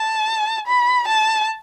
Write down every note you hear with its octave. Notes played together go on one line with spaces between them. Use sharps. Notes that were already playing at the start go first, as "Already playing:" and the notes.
Already playing: A5
B5
A5